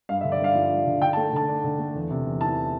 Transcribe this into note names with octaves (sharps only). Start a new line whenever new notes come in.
G2 F5
E5
D3
D5
G2 F5
F3
G2
D3
D3 G5
A5
A3
D3 A5
D4
D3
A3
E2
C3
E2
E3 A5